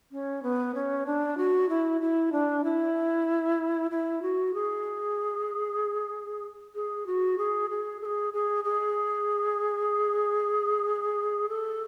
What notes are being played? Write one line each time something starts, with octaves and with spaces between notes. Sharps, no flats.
C#4
B3
C#4
D4
F#4
E4
E4
D4
E4
E4
F#4
G#4
G#4
F#4
G#4
G#4
A4
G#4
G#4
G#4
A4